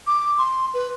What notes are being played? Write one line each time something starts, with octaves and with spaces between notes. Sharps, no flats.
D6
C6
B4